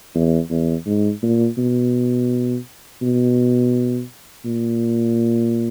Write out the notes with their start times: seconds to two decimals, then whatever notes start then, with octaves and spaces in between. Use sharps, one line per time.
0.15 E2
0.50 E2
0.86 G#2
1.22 A#2
1.58 B2
3.02 B2
4.45 A#2